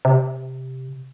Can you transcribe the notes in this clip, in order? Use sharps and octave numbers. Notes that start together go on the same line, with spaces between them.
C3